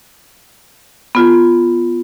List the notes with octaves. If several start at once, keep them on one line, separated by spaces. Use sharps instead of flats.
B3 F4